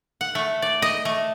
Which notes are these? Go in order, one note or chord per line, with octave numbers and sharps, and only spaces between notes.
F#5
A3
D5
D#5
A3